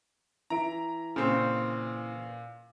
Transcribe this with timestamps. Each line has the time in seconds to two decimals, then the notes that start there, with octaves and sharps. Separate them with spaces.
0.50 E3 E5 A#5 D7
1.16 A#2 C#3 C4